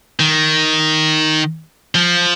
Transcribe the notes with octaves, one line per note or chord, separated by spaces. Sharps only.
D#3
F3